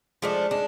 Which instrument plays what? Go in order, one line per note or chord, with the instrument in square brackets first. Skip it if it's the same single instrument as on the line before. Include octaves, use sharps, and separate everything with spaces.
[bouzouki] F3 A3 D4 [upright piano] G#3
[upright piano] G#3 [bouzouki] D4